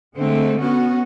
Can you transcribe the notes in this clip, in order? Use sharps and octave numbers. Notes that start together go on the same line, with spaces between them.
D3 G#3 A3 C4
B3 C#4 F#4